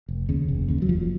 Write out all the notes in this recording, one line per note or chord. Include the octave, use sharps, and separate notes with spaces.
F1
D#2 C#3
F1
D#2 C#3
F#3
F1 F3